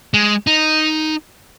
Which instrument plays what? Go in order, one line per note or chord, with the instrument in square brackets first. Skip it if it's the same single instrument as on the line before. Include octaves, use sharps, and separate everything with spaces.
[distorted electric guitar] G#3
D#4